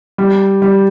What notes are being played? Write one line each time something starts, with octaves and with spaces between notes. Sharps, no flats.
G3
G3